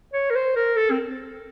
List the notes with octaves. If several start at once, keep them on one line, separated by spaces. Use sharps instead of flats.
C#5
A#4
C5
A#4
A4
C4